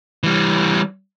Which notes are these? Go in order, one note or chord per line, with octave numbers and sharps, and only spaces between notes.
E3 G3